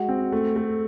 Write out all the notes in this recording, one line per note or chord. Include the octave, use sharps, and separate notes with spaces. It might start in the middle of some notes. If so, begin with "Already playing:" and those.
Already playing: G#3 F#4
C4
A3
A3